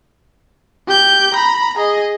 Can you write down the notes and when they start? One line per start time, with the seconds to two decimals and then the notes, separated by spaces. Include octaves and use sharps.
0.87 G4 G6
1.34 A#5 B5
1.77 G#4 D#5